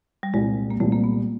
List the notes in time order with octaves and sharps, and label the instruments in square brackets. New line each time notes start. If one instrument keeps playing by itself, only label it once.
[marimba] G3
[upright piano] C2 A#2 G3 C4 [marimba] G#3
[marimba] A#3
[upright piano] C2 A#2 G3 C4 [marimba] A3
[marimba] A#3
B3